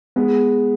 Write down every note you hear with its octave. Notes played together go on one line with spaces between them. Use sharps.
G#3 B3